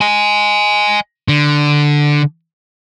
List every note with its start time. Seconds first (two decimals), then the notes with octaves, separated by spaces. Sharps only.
0.01 D#5 G#5
1.28 D3